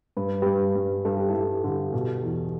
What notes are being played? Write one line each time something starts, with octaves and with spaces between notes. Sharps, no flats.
G2 B4
G2 G4 B4
G2
G2 A4
G4
G2 E4 A4
D3
B2
E2